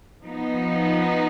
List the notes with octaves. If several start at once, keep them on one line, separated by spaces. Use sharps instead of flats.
F3 B3 D#4